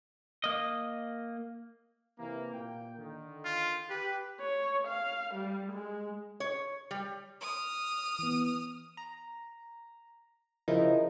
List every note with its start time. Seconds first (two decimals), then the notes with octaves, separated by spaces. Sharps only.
0.44 A#3 D#5
2.18 C3 E3 A#3
2.53 A#2 A#3 G5
2.97 D3 D#3
3.45 F4
3.90 G4 B4
4.40 C#5
4.88 F5
5.34 G3
5.72 G#3
6.40 C#5
6.91 G3
7.41 D#6 F6
8.19 E3 B3
8.97 A#5
10.68 C#3 F3 D#4 E4 A#4